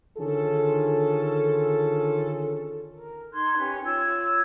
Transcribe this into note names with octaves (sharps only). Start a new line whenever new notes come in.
D3 D#3 C#4 F4 G#4 A4
A#4
D#4 C6 F#6 G#6
C#4 G4 B4
F4 C#5 E6 G#6